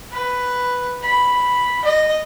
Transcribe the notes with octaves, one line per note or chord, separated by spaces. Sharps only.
B4
B5
D#5